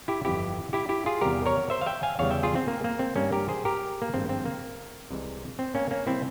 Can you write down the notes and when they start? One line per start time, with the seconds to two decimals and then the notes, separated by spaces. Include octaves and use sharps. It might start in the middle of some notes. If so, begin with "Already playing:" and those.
0.08 E4 G4
0.25 G1 F2 E3 E4 G4
0.73 E4 G4
0.89 E4 G4
1.06 F4 G#4
1.21 E2 C3 G3 G4 A#4
1.46 A#4 C#5
1.70 C5 E5
1.81 F5
1.86 E5 G5
2.03 F5 G#5
2.19 E2 C#3 E3 G3 C#5 F5
2.31 E5 G5
2.43 F4 G#4
2.55 C4
2.68 A#3
2.84 A#3
2.99 C4
3.16 G2 G3 A#3 C#4
3.32 G4 A#4
3.48 G#4 C5
3.65 G4 A#4
4.02 A#3
4.13 G#1 G2 F3 G#3 C4
4.29 C4
4.45 A#3
5.10 C2 C3 E3 G#3
5.59 C4
5.75 A#3 C#4
5.91 A#3 C#4
6.07 C3 E3 G3 C4 E4